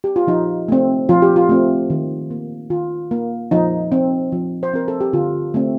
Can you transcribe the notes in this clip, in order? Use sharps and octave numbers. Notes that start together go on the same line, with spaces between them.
G4
F4
F3 D#4
A3 C4
F3 F4
G4
F4
A3 C4
D#3
A#3
D#3 F4
A#3
F3 D#4
C4
F3
C5
C4 A#4
A4
G4
D3 F4
A3 C4